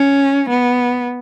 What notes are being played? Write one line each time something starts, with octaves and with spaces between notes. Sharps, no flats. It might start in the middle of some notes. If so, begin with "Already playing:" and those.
Already playing: C#4
B3